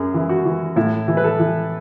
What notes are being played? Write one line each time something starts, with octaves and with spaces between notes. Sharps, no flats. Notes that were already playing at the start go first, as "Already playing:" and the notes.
Already playing: F#2 G#4
E3
F#4
E3
A2 E4
E3
B4
A4
E3